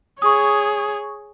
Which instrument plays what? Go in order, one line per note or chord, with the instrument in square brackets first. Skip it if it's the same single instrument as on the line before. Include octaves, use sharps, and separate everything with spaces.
[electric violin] G#4 C#5 [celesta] C#6 D#6